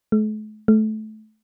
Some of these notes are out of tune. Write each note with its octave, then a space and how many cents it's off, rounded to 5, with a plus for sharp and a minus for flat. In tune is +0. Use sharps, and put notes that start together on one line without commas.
A3 -45
A3 -20